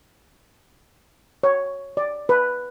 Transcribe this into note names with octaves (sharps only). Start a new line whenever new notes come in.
C#5
D5
B4